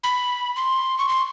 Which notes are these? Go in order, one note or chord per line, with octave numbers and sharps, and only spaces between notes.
B5
C6
C#6
C6